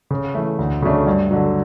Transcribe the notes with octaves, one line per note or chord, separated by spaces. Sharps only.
C#3
E3 A3
D2
C#3 F#3 A3 D4
G2
D3 F#3